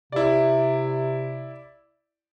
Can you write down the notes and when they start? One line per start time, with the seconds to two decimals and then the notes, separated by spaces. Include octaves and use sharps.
0.12 C3 E4 D5